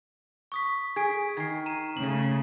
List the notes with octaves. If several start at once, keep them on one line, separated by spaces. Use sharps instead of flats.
C#6 D#6 B6
G#4 G#6 B6 D7
D#3 G#6 C7
A#5 D#7 E7
C#3 A3 F#7